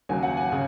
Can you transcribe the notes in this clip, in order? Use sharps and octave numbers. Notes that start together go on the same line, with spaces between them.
D#2 C#3 F#3 G#5
F#5
G#5
C#3